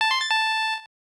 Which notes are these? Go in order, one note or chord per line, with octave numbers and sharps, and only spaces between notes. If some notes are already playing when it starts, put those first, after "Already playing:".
A5
C6
A6
A5